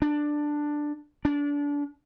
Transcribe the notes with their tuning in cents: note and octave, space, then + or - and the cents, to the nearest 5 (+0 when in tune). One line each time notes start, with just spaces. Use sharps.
D4 +10
D4 -25